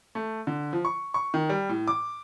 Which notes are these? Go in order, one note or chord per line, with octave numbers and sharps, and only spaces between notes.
A3
D3
F3
C#6
C#6
D#3
G3
A2
D6